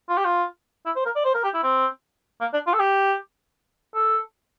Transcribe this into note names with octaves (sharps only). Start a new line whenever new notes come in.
F4
G4
F4
E4
C5
A#4
D5
C5
A#4
G4
E4
C4
A#3
D4
F4
A4
G4
A4